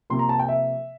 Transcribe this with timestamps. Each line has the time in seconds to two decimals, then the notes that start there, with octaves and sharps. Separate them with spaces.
0.10 C3 F3 A#3 C6
0.19 A#5
0.29 A5
0.39 G5
0.49 E5